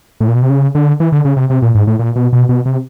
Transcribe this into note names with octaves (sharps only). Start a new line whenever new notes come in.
A2
A#2
B2
C3
C#3
D3
E3
D3
C#3
C3
C3
A#2
G#2
A2
A#2
B2
B2
B2
C3